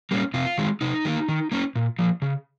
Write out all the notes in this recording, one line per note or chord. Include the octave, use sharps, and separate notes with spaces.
G3 A#3 C#4
C3 F4
D#3 G#3
C3 D#4
D#3 G3 A#3
D#3
A#3 C#4
A#2
F3 A#3
C#3